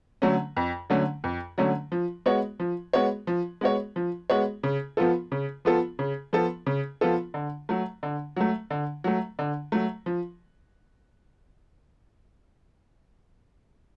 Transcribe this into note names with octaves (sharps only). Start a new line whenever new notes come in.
D3 F#3 A3 C#4
F2
D3 F#3 A3 C#4
F2
D3 F#3 A3 C#4
F3
G#3 B3 F#4 C#5
F3
G#3 B3 F#4 C#5
F3
G#3 B3 F#4 C#5
F3
G#3 B3 F#4 C#5
C#3
F3 B3 F4 A4
C#3
F3 B3 F4 A4
C#3
F3 B3 F4 A4
C#3
F3 B3 F4 A4
D3
F#3 A3
D3
F#3 A3
D3
F#3 A3
D3
F#3 A3
F3